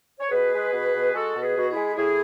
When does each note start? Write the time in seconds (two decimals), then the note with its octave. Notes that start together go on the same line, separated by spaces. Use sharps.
0.19 C#5
0.30 B2 G#4 B4
0.52 G#3
0.72 B2
0.93 B2
1.13 G#3 F#4 A4
1.35 B2
1.41 G#4 B4
1.55 B2 F#4
1.69 E4 G#4
1.75 G#3
1.96 A2 E4 G#4